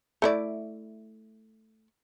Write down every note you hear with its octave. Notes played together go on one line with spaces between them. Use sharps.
A3 E4 D5